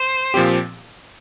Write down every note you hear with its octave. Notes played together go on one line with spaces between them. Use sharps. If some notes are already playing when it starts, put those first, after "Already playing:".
Already playing: C5
A#2 F3 C4 G4